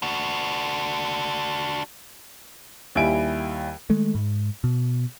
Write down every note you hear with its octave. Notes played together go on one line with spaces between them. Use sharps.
D4 F#4
D#2 G3 E4 G#5 D7
D#3 G#3 A3
G#2
B2